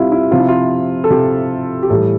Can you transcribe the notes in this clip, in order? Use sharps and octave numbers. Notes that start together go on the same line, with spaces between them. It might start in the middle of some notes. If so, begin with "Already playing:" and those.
Already playing: C3 G3 E4 F4
E4
C3 F3 F4
E4
F4
A4
C3 F3 G4
G4
A2 E3 G3 A4